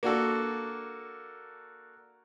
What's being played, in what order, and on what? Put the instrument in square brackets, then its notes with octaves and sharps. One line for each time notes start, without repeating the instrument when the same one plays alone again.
[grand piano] A#3 D4 F#4 A4